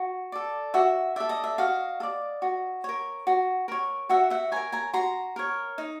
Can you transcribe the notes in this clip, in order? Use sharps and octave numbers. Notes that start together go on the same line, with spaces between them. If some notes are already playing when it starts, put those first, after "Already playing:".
Already playing: F#4
A4 D5
F#4 E5
A4 D5 E5
D#5
E5
F#4 D#5 F5
A4
D5
F#4
A#4 C#5
F#4
A#4 C#5
F#4 E5 F#5
E5 F#5
A#4 C#5 G#5 A#5
G#5 A#5
F#4 A#5 C6
A#4 C#5
D#4